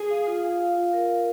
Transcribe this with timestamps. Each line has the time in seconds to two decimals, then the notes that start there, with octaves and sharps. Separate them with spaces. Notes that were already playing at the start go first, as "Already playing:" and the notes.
Already playing: G#4
0.10 F5
0.27 F4
0.44 F5
0.60 F5
0.77 F4
0.93 A#4
1.10 A#4